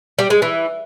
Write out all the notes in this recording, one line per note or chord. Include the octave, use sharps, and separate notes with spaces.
G3
G#3
E3